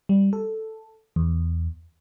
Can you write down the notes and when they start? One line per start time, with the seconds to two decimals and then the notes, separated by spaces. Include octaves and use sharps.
0.09 G3
0.33 A4
1.16 E2